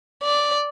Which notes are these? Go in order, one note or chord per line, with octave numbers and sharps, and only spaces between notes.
D5